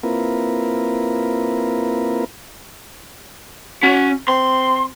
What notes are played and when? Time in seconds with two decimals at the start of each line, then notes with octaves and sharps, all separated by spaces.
0.03 A#3 C4 E4 F4 A#4 B4
3.83 C#4 F#4
4.28 C4 C6